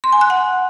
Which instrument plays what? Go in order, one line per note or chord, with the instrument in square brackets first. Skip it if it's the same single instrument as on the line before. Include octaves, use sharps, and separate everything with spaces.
[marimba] C6
G#5
F#6
F#5